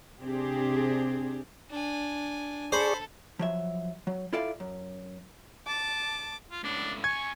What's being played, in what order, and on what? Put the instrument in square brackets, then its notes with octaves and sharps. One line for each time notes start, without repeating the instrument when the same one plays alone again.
[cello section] C3 C4 D4 G4 G#4
[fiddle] D4 G#5
[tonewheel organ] G#4 D5 C#6 [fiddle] A4 [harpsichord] C5 B5
[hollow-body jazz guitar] F3 F#3 E5
F#3
E4 F4 A4 D5 E5 F5
F#2
[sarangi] A5 [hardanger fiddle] D6
[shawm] F4
[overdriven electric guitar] C#2 A2 [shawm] D4
[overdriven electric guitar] F2 G#5 [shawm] C#6 [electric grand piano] G#6